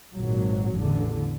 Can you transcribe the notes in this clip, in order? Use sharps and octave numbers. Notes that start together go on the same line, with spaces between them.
G#1 A#2 F#3
A1 E2 D3